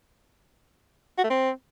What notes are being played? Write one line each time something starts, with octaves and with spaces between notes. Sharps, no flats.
F#4
A3
C4